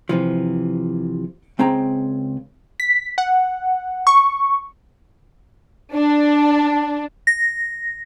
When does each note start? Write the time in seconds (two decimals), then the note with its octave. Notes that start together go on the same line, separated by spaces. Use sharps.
0.09 C3 E3 F3
1.59 C#2 C4 G#4 G5 A#5
2.80 B6
3.18 F#5
4.07 C#6
5.94 D4
7.27 A#6